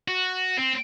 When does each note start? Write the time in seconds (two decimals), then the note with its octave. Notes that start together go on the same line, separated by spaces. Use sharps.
0.08 F#4
0.57 C4